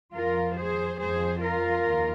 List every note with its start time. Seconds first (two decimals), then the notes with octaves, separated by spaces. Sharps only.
0.13 F2 F3 F4 A#4
0.56 G#4 C5
0.98 F2 F3 G#4 C5
1.41 F4 A#4
1.84 D#2